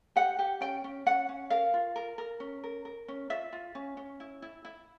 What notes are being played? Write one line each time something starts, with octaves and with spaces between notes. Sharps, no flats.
G4 F#5
G4
C#4 G5
C#4
C#4 F#5
C#4
A#4 F5
F4
A#4
A#4
C#4
A#4
A#4
C#4
F4 E5
F4
C#4
C#4
E4
E4
E4